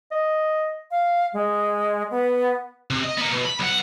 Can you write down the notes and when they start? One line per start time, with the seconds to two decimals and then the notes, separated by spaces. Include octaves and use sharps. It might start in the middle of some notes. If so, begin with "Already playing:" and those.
0.12 D#5
0.91 F5
1.33 G#3
2.11 B3
2.90 C3
3.04 D#5
3.17 A#3 B3
3.31 B2
3.45 B5
3.59 B1 F#5